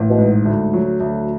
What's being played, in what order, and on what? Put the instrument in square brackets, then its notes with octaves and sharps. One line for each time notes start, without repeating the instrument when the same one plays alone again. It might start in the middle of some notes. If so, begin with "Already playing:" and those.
Already playing: [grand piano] A1
[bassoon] B2
[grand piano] G#2
D2
F#3
D2